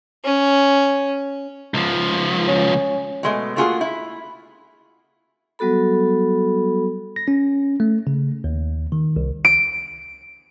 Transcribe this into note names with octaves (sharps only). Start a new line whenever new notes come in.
C#4
C#2 F3
C#4
B2 G#3 A3
A3 A#3 F4 F#4 G#4
E4
F#3 G3 B3 F#4 A4 B5
A#6
C#4
A3
C#3
D#2
D#3
C2
D7